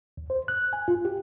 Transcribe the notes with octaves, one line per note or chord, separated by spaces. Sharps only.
D#2
C5
F#6
G#5
F4
G4